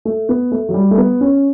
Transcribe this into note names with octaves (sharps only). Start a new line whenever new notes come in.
A3
B3
A3
F#3
G3
A3
B3
C#4